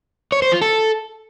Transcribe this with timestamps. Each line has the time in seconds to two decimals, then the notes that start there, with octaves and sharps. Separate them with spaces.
0.32 C#5
0.42 C5
0.52 F4
0.62 A4